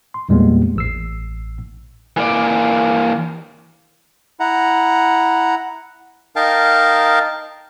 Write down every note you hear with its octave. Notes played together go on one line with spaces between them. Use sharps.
C6
E2 A#2 G3 G#3 A#3 B3
A1 E6 C7
E3 A#3 D5
E4 F#5 A#5
D#4 A#4 F5 G5 A5